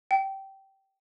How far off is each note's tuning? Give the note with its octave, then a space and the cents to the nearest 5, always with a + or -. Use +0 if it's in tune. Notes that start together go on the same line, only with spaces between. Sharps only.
G5 -15